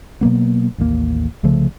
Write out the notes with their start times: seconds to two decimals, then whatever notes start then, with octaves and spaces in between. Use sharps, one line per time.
0.21 B2 F#3 A#3 B3
0.78 A1 D#2 G#3 A#3
1.43 C2 C#3 F3 A3